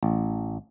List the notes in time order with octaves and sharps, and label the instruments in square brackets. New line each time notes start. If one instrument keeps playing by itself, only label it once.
[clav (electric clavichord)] A1